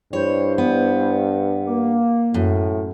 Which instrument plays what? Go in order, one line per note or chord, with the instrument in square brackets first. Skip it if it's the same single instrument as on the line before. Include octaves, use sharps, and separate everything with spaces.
[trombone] G2 [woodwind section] G3 E4 C5 [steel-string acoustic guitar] C#5
[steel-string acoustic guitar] B3
[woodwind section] A#3
[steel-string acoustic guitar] F#2 [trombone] A2